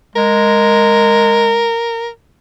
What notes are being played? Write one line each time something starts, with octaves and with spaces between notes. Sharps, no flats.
G#3 A#4